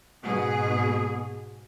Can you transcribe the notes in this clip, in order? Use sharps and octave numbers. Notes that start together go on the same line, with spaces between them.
G#2 B2 G#4